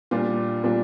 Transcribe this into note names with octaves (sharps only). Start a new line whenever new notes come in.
A#2 G3 D4 F4
A#2 G3 D4 F4